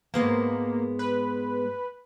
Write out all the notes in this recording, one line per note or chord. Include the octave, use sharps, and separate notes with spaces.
G#2 G#3 A#3 B3
B4